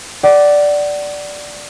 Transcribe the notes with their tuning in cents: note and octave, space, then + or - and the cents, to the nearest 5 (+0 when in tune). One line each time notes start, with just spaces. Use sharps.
D5 +0 F#5 +30